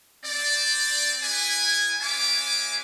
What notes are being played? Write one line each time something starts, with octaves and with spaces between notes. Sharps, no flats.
C4 D5
E4 G#4 B4 G#5
G#3 C#4 F4 E5 G#5 D6